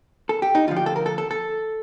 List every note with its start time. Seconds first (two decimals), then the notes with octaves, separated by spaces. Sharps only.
0.29 A4
0.42 G4
0.55 D#4
0.67 D2 D3 F3 F4
0.76 G4
0.86 A4
0.96 A#4
1.06 A4
1.18 A4
1.31 A4